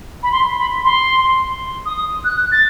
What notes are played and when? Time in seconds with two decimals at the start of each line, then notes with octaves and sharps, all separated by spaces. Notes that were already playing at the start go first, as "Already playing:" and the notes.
0.23 B5
0.32 C6
0.58 B5
0.84 C6
1.86 D#6
2.25 F#6
2.52 A6